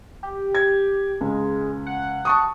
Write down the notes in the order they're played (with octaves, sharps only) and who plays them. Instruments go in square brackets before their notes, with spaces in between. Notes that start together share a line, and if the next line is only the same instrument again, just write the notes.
[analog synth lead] G4
[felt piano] G#6
[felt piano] C#2 [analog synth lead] G#3
[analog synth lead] F#5
[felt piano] A5 C#6 D#6